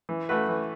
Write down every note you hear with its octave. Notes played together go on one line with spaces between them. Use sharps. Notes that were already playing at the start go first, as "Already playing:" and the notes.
E3
A3 F#4 B4
E3